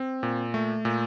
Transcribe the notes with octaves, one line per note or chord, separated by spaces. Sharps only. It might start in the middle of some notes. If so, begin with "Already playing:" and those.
Already playing: C4
A#2
A3
A#2